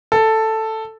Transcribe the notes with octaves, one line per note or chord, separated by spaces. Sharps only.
A4